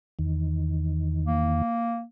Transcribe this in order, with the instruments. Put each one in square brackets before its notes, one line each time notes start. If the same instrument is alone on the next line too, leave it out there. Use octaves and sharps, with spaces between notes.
[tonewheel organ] E2 D#3
[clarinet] A#3